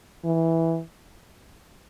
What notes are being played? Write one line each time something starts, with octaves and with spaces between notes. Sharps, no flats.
E3